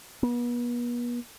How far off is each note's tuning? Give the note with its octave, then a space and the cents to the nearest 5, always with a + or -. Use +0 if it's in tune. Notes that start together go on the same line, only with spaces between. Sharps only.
B3 -40